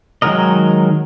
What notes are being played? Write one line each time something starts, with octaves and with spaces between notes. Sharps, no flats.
D#3 F#3 G#3 A#4 D#5